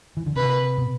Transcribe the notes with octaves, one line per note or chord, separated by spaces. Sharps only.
E3
D3
C3 B4
B2